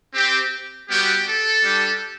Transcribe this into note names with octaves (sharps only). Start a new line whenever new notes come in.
C4 G4
G3 B3 F#4 G4
A4
G3 D4 G4